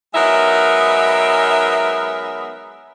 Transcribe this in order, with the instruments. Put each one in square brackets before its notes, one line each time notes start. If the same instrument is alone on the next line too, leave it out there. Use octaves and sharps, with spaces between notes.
[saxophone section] F#3 G#3 B3 D#4 A#4 E5